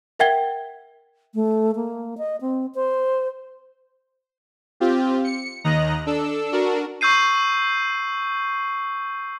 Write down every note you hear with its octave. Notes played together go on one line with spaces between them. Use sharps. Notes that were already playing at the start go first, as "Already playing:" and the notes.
A#4 E5 F#5 G5 G#6 G7
A3
A#3
D#5
C4
C5
C4 F4 G4
C#7
D#2 D#3 D#5 A#5 F#6 A#6
D4 A4 E6
D4 F#4 A#4
C#6 E6 G6 C7 D#7